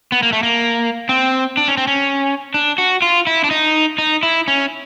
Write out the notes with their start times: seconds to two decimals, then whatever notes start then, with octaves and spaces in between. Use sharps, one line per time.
0.12 B3
0.23 A#3
0.33 A3
0.43 A#3
1.09 C4
1.57 D4
1.68 C#4
1.77 C4
1.87 C#4
2.54 D4
2.78 F#4
3.02 F4
3.27 E4
3.44 D4
3.51 D#4
3.98 D#4
4.23 E4
4.48 C#4